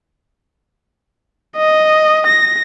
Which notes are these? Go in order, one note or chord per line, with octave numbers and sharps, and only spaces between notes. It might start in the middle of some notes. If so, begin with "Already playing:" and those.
D#5
A#6